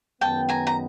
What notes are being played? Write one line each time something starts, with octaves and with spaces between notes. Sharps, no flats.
F#2 D#3 G#3 B3 G5 A5
G#5 A#5
A#5